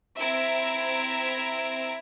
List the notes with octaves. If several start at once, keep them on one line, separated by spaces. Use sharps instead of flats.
C4 E4 E5 A#5 G#6 D7